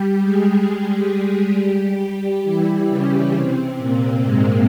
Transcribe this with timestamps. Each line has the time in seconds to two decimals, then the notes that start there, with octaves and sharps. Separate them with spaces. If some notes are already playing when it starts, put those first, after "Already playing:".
Already playing: G3 G4
0.21 G#3 G#4
0.65 G3 G4
2.44 E3 E4
2.88 C#3 C#4
3.33 C3 C4
3.77 A#2 A#3
4.22 G#2 G#3